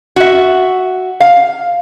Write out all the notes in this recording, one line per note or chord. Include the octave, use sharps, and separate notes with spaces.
F#4 E5
F5